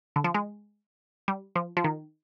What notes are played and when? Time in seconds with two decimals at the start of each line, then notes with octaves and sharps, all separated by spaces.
0.16 D3
0.24 F3
0.34 G#3
1.28 G3
1.56 F3
1.77 F3
1.84 D#3